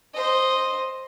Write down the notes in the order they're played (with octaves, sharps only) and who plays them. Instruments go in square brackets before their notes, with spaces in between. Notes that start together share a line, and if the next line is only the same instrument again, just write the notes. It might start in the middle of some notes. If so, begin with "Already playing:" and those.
[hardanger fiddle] C5 D#5